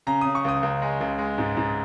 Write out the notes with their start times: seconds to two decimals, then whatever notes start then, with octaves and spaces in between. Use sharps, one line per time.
0.07 C#3 A#5
0.21 C#3 D#6
0.35 C#6
0.44 C#2 D#6
0.63 C#2
0.82 G#3
1.01 C#2
1.18 G#3
1.38 G#2
1.57 G#2